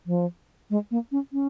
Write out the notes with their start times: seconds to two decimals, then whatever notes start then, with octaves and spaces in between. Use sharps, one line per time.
0.07 F3
0.70 G#3
0.91 A#3
1.12 C#4
1.33 C#4